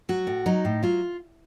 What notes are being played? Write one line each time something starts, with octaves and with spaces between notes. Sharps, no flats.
F#3 F#4
A2
F#3 D#4
A2
F#3 F4